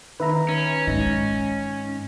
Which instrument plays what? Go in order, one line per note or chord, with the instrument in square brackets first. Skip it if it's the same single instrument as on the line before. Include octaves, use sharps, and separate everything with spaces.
[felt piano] D#3 [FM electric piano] B4 E5 A#5
[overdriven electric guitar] C#4
[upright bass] G#2 [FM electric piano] D#4 A#6